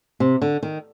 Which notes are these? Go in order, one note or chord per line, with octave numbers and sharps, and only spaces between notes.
C3
D3
D#3